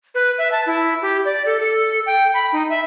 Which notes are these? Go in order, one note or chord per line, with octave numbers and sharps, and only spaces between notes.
B4
E5
A5
E4
G4
D5
A4
A4
G5
B5
D#4
E5